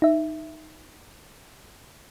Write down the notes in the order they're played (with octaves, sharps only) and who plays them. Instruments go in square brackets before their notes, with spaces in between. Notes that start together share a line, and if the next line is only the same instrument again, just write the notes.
[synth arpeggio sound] D#4 E5